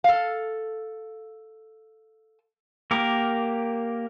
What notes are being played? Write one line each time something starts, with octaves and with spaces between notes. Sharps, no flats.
A4 F5
A#3 G4 A#4